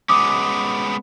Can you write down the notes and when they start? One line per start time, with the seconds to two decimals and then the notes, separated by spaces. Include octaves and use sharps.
0.09 G#3 B3 C#4 D6 D#6